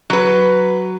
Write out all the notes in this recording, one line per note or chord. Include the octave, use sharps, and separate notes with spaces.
F#3 B4